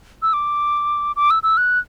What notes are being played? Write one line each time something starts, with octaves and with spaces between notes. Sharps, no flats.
E6
D6
D6
E6
E6
F#6